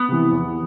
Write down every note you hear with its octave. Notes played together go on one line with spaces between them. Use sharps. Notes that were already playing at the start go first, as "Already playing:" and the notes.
Already playing: B3
C3 E3
E2